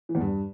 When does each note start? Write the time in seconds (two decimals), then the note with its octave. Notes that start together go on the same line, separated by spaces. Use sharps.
0.09 E3
0.15 E2
0.21 G2